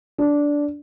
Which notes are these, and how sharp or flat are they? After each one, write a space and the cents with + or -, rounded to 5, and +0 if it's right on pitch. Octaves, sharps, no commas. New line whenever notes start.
D4 -10